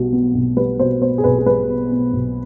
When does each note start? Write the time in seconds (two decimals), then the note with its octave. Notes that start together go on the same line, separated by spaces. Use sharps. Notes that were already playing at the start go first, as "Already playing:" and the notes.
Already playing: B1 B2 G3
0.12 B3
0.35 B1
0.56 G3 B4
0.79 B2 C5
1.02 B3 C5
1.18 G#4
1.24 B1 B4
1.38 G#4
1.46 G3 B4
1.69 B2
1.91 B3
2.13 B1